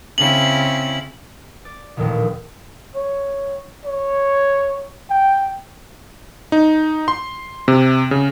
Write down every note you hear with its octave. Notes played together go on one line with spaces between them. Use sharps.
C#3 C4 E4 F#7
D5
A1 D#2 A#2 D3 D#3 F3
C#5
C#5
G5
D#4
C6
C3
C#3